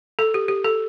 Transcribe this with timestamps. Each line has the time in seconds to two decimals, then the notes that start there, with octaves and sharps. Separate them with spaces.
0.19 A4
0.34 G4
0.48 G4
0.64 A4